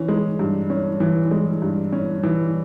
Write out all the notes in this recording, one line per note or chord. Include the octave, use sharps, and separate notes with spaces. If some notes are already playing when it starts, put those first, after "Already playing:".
Already playing: E3 C#4
G#3
G2
C#4
E3
G#3
G2
C#4
E3